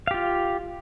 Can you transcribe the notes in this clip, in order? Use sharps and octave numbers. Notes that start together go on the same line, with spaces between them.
F4 G4 F5